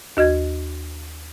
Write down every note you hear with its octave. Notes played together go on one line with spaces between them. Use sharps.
D#2 F#4 D#5 G#6